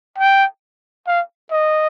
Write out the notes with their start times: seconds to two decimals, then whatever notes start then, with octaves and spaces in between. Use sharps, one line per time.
0.18 G5
1.07 F5
1.51 D#5